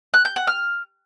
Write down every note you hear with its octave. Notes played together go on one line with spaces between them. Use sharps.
F#6
G6
F#5
F6